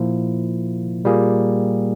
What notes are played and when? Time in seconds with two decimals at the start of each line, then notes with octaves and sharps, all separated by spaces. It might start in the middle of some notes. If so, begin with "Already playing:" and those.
Already playing: A#2 F3 A#3 E4
1.04 A#2 G3 A#3 F4 G#4